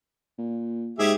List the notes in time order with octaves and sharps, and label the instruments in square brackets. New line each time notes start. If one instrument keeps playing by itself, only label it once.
[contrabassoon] A#2
[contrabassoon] G#2 [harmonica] G4 G#4 E5